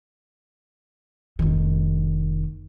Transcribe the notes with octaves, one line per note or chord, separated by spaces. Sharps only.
F1 D#3